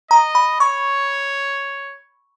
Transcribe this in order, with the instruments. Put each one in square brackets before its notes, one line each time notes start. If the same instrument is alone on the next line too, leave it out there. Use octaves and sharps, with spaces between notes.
[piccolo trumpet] D#5 [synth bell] A#5
[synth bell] B5
[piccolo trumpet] C#5 [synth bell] C#6